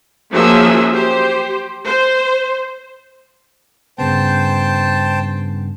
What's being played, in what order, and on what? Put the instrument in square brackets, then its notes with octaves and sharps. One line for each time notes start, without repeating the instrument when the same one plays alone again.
[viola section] F3 F#3 A#3 C#4 G#4 E5
G4 C5
C5
[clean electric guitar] G2 C#3 B3 [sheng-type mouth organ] C5 G5 A5